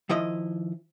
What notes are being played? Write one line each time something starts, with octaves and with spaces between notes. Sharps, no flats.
D#3 F3 E4 D#5